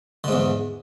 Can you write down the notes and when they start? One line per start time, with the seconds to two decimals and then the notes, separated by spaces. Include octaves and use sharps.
0.24 D3
0.28 G#2
0.32 E2